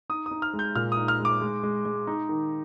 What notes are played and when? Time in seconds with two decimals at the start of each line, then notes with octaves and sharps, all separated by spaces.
0.09 D#4 D#6
0.26 D#6
0.31 D#4
0.42 F6
0.53 G#3
0.59 G6
0.75 A#2 F6
0.92 D#6
0.97 D#4
1.08 F6
1.19 G#3
1.25 D6
1.41 G#3
1.63 G#3
1.85 G#3
2.07 D#4
2.29 D#3